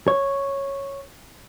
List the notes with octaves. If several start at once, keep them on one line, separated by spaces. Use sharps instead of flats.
C#5